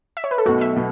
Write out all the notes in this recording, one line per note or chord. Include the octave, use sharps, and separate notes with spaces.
E5
C#5
B4
A4
B1 B2 A3 F#4
E5
B2